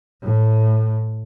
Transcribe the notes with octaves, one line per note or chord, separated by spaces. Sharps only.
A2